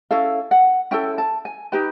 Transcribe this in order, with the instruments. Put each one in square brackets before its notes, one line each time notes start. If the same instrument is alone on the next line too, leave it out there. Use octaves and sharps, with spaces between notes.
[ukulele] C#4 E4 A4 F5
F#5
C#4 E4 A4 G5
A5
G#5
D#4 G4 B4 G5